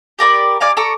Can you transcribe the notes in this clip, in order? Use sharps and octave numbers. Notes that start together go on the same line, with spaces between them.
G4 A#4 D5 B5
D5 F5 G#5 A#5
A4 A#5 C#6 D6